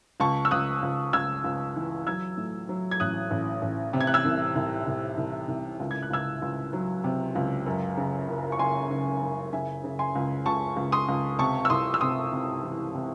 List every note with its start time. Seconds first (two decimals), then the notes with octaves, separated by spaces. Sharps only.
0.20 C#2 A5 C#6
0.45 E6
0.51 C#2 D#6 F#6
0.82 C#2
1.13 C#2 E6 G#6
1.44 C#2
1.76 E3
2.07 F#3 E6 G#6
2.37 A2
2.69 F#3
2.91 G#6
3.00 A1 D#6 F#6
3.31 A1
3.62 A1
3.93 C3
4.01 G#6
4.07 F#6
4.14 E6 G#6
4.25 C2
4.55 C2
4.86 C2
5.17 C2
5.48 C2
5.80 C#2
5.91 G#6
6.02 F#6
6.10 C#2 E6 G#6
6.42 C#2
6.73 F#3
7.04 C3
7.35 C#2
7.66 F#2
7.97 C#3
8.28 F#1
8.52 C#6
8.59 F#1 G#5 C6
8.91 C#3
9.22 F#1
9.52 C#3 E5 G#5
9.84 C#3
9.99 G#5 C6
10.15 C#2
10.46 C#2 A5 C#6
10.76 C#2
10.92 C6 D#6
11.08 C#2
11.39 C3 A5 C#6
11.65 E6
11.70 C2 C6 D#6
11.94 E6
12.01 C3 C6 D#6
12.33 C3
12.63 E3
12.94 C3